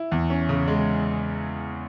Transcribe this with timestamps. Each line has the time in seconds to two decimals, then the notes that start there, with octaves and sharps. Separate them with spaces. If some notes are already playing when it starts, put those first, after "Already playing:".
Already playing: E4
0.12 E2
0.30 C#4
0.49 C#3
0.68 G#3